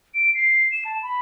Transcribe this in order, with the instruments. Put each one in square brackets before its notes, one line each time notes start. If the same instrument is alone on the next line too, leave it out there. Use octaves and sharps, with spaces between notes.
[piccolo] D7
C7
E7
A5
B5